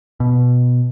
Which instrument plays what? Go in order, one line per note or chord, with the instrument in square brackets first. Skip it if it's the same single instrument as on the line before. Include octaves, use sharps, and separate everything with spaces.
[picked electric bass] B2